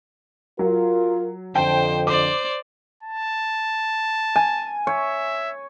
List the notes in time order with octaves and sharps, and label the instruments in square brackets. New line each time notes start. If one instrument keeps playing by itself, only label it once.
[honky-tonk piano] F#3 [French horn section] F4 A#4
[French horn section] F2 D3 [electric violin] C5 [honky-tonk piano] G5 A5
[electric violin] C5 D5 [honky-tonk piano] D6
[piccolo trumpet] A5
[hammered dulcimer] G#5
[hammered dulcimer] C#5 [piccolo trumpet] E5